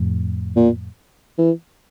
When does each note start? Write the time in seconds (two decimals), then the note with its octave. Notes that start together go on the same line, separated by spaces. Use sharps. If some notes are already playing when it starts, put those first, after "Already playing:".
Already playing: F2 A2
0.56 A#2
1.38 E3